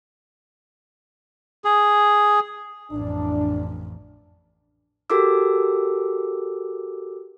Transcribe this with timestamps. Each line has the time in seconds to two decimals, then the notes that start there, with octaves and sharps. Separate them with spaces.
1.65 G#4
2.92 A1 F2 D4
5.10 F#4 G4 A4 A#4 D6 E6